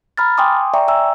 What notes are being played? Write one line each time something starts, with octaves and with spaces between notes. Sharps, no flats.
A#5 B5 F6 A6
G5 G#5 C6 D6 D#6
D5 E5 G5 A#5 C#6
E5 G5 G#5 A#5 E6